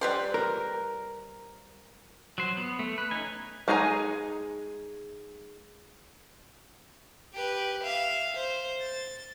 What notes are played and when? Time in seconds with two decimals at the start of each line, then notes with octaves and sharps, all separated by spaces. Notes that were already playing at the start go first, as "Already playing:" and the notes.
0.01 G3 B4 C5
0.34 A#4
2.38 F#3 C5
2.57 B3
2.79 A3
2.98 B4
3.11 C#4 D#4 G#5
3.68 G#3 D#4 G#4 G#5 A#5
7.34 G4 B4
7.84 E5 F5
8.35 C5
8.82 A6